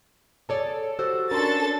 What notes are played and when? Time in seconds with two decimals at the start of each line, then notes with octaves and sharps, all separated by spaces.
0.49 G#4 A4 C#5 D5
0.99 F#4 G4 C5 E6
1.31 C#4 D4 A4 A#4 A#5 C6 A6